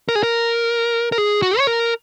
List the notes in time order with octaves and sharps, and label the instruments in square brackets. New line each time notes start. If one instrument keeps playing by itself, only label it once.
[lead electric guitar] A#4
G#4
A#4
A#4
G#4
F#4
C#5
A#4